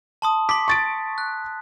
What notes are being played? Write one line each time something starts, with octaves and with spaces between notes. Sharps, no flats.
A5 C6 D#6
C6 D6 B6
C#6 A6 D7
F#6